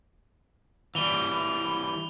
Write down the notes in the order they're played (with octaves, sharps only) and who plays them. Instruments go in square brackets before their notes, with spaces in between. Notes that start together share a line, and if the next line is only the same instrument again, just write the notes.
[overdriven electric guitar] E3 G3 [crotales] F7 G7